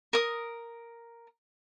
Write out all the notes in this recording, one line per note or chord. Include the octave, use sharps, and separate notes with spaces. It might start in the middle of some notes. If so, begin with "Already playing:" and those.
A#4 D#6